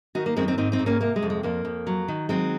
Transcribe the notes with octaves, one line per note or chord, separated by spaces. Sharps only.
D#3 D#4 F#4
A#3
F#2 G#3 C4
C4 D#4
G#2 C4 D#4
C4 D#4
G#2
A#3 C#4
C3 A#3
G#3
F2
G#3
F2 A#3
F2
F#3
D#3
F#3 G#3 C4